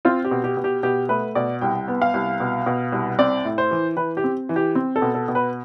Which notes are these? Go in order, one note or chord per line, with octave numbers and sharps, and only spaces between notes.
C4 F4
G4
B2
G4
B2
G4
B2 G4
A3 B4
B2 D5
C2 G5
B3
F5
C2
B2
B2
C2
C4 D5
A2
C5
E3
E3 B4
G4
C4
E3
G4
C4
A4
B2
A4
B2
B4